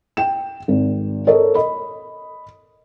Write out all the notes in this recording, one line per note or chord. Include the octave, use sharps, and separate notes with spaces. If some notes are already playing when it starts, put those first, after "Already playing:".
G5 E7
G#1
A4 A#4 C#5 D#5
D#5 B5